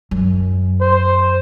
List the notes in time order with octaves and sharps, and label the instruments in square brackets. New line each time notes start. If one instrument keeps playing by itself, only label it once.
[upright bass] F#2
[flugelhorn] C5